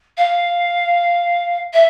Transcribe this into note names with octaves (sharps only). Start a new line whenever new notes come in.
F5
E5